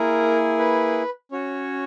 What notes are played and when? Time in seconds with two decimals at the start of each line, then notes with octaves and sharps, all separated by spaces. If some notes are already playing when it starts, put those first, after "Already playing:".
Already playing: A#3 E4 G#4 A#4
0.59 B4
1.32 C#4 F#4 C#5